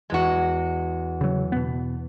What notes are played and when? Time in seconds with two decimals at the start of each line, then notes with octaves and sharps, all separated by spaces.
0.10 E2 G#3 F#4 G#6 A#6
1.21 C#3 F#3
1.52 B2 B3